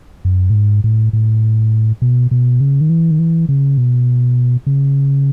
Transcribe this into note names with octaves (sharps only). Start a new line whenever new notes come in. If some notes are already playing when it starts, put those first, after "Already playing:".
F#2
A2
G#2
A2
A2
B2
B2
C#3
D#3
E3
D#3
E3
C#3
B2
C#3